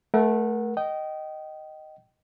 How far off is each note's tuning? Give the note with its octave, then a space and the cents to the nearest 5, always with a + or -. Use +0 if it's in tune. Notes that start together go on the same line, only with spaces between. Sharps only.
A3 -15 A#4 +35 F#5 +0
D#5 -5 G5 -25